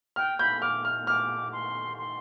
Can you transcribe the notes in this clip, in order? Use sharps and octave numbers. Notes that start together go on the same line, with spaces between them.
G5 F6
B5 G6
D6 F6
F6
D6 F6
C6
C6